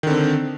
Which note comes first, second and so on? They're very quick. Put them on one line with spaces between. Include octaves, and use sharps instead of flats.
D#3 D3 C4